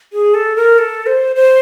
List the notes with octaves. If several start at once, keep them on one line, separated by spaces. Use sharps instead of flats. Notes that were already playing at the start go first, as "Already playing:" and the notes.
G#4
A4
A#4
A4
C5
C5